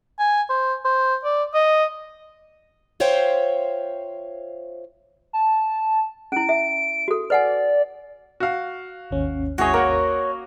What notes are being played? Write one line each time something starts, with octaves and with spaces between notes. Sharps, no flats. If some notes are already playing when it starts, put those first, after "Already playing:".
G#5
C5
C5
D5
D#5
F4 C5 C#5 E5 F5 G5
A5
C#4 E4 D7
E5
F#4 A4
B4 D5 F#5 G#5
F#4 F5
G#1 D#2 C#4
G#3 E4 F#4 G#4 C#5 D#5
A#3 A#4 F#5